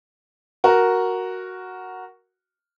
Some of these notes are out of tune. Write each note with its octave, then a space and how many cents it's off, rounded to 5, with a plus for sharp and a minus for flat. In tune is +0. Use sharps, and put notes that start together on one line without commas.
F#4 +0 A#4 +0